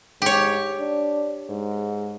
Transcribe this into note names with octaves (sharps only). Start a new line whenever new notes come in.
G#2 G4 C#5
D4
G#2